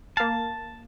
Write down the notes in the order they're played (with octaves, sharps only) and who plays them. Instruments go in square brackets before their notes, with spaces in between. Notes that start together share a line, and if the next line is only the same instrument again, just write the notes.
[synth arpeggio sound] A#3 F5 [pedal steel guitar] A5